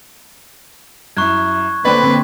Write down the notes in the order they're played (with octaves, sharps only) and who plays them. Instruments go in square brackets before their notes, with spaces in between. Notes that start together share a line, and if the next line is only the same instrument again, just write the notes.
[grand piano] F#2 E4 [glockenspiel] C#6 F#6 G#6
[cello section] D3 A#3 C4 [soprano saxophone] B4 [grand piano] D5 G5 B5